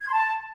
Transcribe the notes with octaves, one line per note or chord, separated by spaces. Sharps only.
G#6
C6
A5